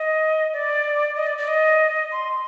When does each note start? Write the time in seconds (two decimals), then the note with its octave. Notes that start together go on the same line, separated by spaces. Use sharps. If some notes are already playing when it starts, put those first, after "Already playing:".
Already playing: D#5
0.53 D5
1.16 D#5
1.27 D5
1.38 D5
1.48 D#5
2.12 C6